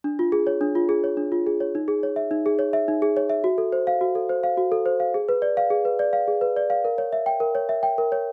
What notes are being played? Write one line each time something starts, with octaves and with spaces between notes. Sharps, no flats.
D4
F4
G#4
C#5
D4
F4
G#4
C#5
D4
F4
G#4
C#5
D#4
G#4
C#5
E5
D#4
G#4
C#5
E5
D#4
G#4
C#5
E5
F#4
A4
C5
F5
F#4
A4
C5
F5
F#4
A4
C5
F5
G#4
B4
D5
F5
G#4
B4
D5
F5
G#4
B4
D5
F5
A#4
C#5
E5
G5
A#4
C#5
E5
G5
A#4
C#5